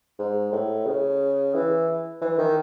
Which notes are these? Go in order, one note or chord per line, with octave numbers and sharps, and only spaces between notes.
G#2
A2
C#3
E3
E3
D#3